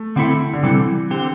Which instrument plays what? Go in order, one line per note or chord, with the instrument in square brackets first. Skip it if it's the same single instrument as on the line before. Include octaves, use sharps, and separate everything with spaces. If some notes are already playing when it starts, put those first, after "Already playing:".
Already playing: [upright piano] A3
[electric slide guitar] D3 C4 E4 A4
[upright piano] D3
[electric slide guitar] C3 G3 C4 A4 [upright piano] E3
[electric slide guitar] D3 C4 G4